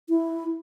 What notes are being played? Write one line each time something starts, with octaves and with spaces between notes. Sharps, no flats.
E4